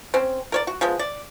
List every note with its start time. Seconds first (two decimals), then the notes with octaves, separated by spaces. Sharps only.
0.14 C4 C#4
0.52 A#4 C#5 D5
0.67 F#4
0.81 F3 G#3 B3
0.99 D5